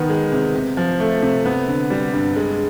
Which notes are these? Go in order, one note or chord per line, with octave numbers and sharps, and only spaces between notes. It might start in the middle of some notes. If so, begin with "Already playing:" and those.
Already playing: D#3 B3
G#3
C3
C3
F3
A3
C3
B3
D3
G3
G2
G#3